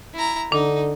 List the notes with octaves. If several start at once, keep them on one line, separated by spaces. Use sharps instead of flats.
E4 A#5
D3 D4 D#4